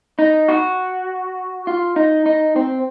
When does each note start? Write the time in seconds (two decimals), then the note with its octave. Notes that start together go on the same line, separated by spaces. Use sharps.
0.19 D#4
0.48 F#4
1.67 F4
1.96 D#4
2.26 D#4
2.56 C4